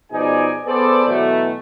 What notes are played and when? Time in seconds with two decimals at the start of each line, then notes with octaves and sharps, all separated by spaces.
0.12 B2 F3 D#4 G#4 D5 G#5
0.66 B3 G#4 A4 B4 C5 D5
1.06 B2 E3 F#3 A3